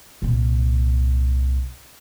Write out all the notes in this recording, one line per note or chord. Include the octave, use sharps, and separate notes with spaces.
C2 A#2